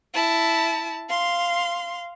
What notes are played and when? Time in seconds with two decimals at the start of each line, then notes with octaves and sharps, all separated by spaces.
0.14 E4 A5
1.10 F5 C6